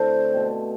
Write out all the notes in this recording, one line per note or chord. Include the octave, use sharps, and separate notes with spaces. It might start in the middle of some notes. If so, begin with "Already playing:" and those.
Already playing: D3 A3 C4 E4 C5
B2 A3 C4